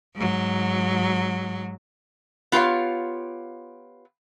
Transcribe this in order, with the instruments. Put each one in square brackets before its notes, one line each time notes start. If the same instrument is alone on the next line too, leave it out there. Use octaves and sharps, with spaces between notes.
[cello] G#2 F#3
[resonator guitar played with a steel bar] B3 F4 G4 A#4 C#5 F5